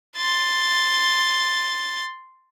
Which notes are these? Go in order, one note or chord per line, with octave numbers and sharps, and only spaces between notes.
C6 A6